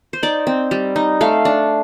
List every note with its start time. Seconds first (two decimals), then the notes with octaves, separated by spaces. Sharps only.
0.13 C5
0.23 D#4 D5
0.47 C4
0.71 G3
0.96 D#4
1.21 A3 F5
1.45 D4